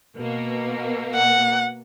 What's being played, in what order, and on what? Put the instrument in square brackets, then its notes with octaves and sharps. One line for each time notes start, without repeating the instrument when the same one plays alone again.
[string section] B2 A#3
[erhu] F#5